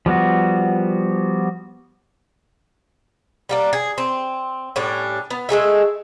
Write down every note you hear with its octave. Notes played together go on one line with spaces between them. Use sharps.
F3 G3 B3 F#4
G3 A#3 D4
G#4
C4
A2 G3 C#4 D4
B3
G#3 A3 G#4 E5